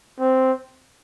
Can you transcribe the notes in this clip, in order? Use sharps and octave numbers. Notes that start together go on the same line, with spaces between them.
C4